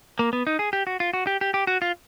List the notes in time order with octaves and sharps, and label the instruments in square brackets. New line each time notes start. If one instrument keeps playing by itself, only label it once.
[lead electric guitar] A#3
B3
D#4
G#4
G4
F#4
F4
F#4
G4
G4
G4
F#4
F4